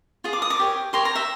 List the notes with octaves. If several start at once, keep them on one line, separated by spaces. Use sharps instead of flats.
F4 G#4
D6
D#6
D6
G4 A#4 C#5
G4 A#4 C#5 C6
A#5
E5